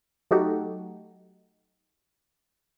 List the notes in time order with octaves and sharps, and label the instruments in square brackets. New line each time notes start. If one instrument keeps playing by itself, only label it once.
[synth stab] F#3 A3 D#4 F#4 G4 A4